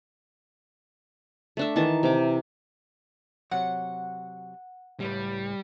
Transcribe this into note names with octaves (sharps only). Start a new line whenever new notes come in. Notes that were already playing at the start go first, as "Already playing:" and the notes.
A3 D4 E5
D#3 E3 A5 A#5
C3 D6
C3 F#3 F#5
C#2 A2 G3 B4